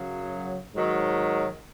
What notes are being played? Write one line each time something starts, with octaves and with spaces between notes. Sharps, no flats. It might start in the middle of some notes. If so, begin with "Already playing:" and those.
Already playing: F#2 C#3 F#3
G#2 D#3 F#3